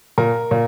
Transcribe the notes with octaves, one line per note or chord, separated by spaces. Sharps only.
A#2 A#4
A#2